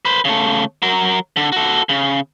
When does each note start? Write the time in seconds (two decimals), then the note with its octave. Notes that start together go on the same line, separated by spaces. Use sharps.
0.05 B4 C5
0.25 C#3 A3
0.82 F#3 A#4
1.37 D3
1.52 F#4 A4
1.89 C#3